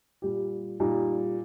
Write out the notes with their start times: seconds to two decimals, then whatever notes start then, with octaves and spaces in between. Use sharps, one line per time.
0.22 A#2 G3 G4
0.80 A#2 G3 D#4